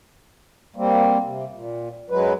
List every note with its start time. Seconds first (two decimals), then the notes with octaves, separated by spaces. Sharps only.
0.76 G3 A#3 C4
1.24 C3
1.53 A#2
2.10 F#2 F#3 G#3 B4